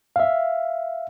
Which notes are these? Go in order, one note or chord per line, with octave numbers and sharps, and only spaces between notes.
E5 F5